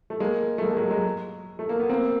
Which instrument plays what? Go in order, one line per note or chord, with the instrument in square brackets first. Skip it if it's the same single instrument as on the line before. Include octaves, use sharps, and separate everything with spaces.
[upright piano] A3
G#3 A#3
A3
G#3 A#3
A3
F#3 G#3
F#3 G#3
A3
A#3
B3
A#3 C4